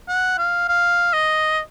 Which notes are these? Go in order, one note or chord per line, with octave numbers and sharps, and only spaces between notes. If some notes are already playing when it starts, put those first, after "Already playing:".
F#5
F5
F5
D#5